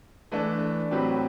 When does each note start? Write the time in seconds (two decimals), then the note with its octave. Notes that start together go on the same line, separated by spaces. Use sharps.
0.32 E3 A3 D4
0.91 A2 F#3 C4 G4 B4